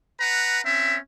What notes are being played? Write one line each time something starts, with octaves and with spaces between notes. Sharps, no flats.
B4 F#5 A#5
C4 C#4 E5